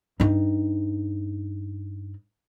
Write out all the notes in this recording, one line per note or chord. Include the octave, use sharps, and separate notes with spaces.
G2 D#4